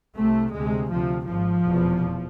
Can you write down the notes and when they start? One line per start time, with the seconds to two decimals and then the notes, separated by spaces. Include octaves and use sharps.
0.17 C2 C3 A3
0.54 D2 C3 G#3
0.91 D2 C3 F3
1.28 G#1 G#2 F3
1.65 F1 E2 B2